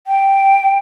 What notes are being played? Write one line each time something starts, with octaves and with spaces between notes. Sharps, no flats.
G5